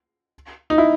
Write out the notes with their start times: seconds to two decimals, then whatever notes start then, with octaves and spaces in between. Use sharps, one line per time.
0.70 D#4
0.78 E4